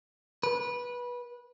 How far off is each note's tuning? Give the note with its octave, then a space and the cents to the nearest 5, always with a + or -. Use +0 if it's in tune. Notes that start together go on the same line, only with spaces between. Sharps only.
B4 -20